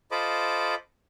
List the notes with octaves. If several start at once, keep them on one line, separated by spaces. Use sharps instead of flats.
F4 A4 C5 D#5 B5 D6